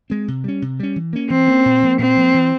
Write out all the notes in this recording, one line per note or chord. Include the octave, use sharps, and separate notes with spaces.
G#3 C4
C3
G3 C#4
C3
G3 C#4
E3
A#3 C#4
E3 C4
A#3 C#4
A#2
F3 A#3
A#2 C4
F3 A#3
E3